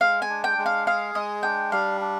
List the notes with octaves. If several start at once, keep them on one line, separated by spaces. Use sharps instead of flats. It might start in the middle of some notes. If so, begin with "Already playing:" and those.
G#3 F5
G#5
D4
G5
G#3
F5
G#4 F5
G#3 D#5
D4 G5
G3 F5
D4